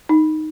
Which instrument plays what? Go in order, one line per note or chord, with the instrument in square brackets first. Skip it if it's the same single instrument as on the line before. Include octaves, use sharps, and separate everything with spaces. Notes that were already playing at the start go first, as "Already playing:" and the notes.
[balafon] D#4